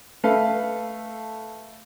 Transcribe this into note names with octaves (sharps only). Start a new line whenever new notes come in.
A3 A4 B4 F5